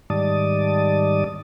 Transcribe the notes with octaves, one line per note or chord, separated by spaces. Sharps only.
G#2 D#3 G3 D5 A5 D#6